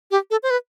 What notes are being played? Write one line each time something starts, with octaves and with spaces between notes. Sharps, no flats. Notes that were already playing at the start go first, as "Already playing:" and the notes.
G4
A4
C5
B4